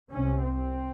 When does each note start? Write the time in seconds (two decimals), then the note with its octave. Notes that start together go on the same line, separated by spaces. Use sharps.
0.10 C2 C3 C#4
0.42 C4